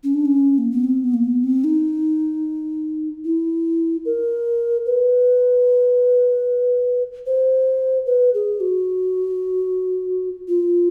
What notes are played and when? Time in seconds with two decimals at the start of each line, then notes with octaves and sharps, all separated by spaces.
0.04 C#4
0.14 D4
0.26 C#4
0.58 A#3
0.72 B3
0.84 C4
1.04 B3
1.14 A#3
1.24 B3
1.44 C4
1.64 D#4
3.25 E4
4.05 A#4
4.86 B4
7.26 C5
8.06 B4
8.34 G#4
8.60 F#4
10.48 F4